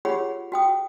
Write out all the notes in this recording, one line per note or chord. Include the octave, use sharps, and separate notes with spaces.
F4 G4 G#4 C#5 F#5 B5
F#4 G5 D#6